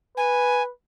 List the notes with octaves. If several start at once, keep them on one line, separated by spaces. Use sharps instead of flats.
B4 G#5